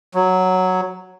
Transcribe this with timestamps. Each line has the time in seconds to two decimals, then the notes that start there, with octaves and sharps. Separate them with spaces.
0.14 F#3